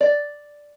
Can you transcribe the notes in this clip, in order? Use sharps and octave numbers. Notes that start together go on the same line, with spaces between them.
D5